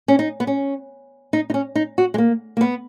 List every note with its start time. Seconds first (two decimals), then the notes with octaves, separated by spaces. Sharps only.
0.08 C#4
0.19 D#4
0.40 B3
0.47 C#4
1.33 D#4
1.50 D#4
1.54 C#4
1.75 D#4
1.98 F#4
2.14 G#3
2.18 A#3
2.57 A#3
2.61 B3